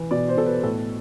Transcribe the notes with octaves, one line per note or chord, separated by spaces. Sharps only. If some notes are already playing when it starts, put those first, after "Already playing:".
Already playing: E3
B2 D5
C5
B2 A4
B4
A2 A4